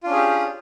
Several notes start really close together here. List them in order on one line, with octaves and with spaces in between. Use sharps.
F4 D4 C#4 G#4 G4